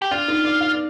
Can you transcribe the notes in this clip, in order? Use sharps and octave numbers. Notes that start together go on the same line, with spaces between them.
G4
D4 F4
D#4
D5
F5
D5